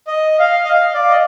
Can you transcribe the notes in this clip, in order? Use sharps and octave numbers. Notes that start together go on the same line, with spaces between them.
D#5
F5
D#5
F5
D5
D#5